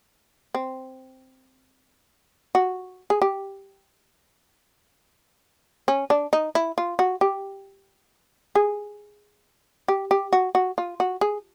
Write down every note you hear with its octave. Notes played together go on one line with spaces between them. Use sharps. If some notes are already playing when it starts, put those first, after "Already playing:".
C4
F#4
G#4
G4
C#4
D4
D#4
E4
F4
F#4
G4
G#4
G4
G4
F#4
F#4
F4
F#4
G#4